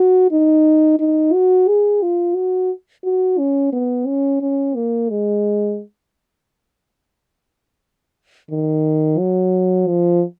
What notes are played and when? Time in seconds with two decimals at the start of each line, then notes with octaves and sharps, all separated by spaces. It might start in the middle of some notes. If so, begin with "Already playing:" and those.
Already playing: F#4
0.31 D#4
0.99 D#4
1.33 F#4
1.68 G#4
2.02 F4
2.35 F#4
3.04 F#4
3.38 C#4
3.72 B3
4.07 C#4
4.41 C#4
4.75 A#3
5.10 G#3
8.50 D#3
9.19 F#3
9.87 F3